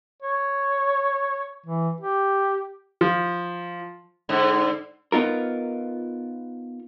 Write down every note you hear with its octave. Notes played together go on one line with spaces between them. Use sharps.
C#5
E3
G4
F3
G#2 D3
B3 D#4 F4 A#4